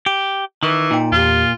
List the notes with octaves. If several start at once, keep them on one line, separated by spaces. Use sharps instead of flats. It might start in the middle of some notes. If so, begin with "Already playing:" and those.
G4
D#3 E3
A#2 D#4 G5
E2 F4 G4